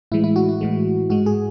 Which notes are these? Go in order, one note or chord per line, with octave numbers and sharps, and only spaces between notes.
A2 E3 G#3 E4
E4
F#4
E4
A2 E3 G#3
G#2 G#3 F#4
G#4